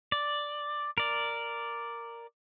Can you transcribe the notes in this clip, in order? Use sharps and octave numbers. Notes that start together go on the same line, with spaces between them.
D5
A#4 D5